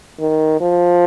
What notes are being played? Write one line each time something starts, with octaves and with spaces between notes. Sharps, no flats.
D#3
F3